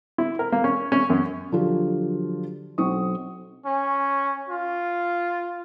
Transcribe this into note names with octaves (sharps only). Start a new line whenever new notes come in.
E4
A#4
A#3
C#4
C#4
F#2
D3 F3 F#3 F4 G4
B1 C4 C#6 D#6
C#4
F4